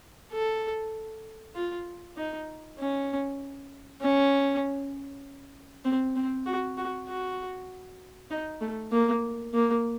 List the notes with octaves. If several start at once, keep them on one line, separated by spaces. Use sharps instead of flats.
A4
F4
D#4
C#4
C#4
C4
C4
F#4
F#4
F#4
D#4
A3
A#3
A#3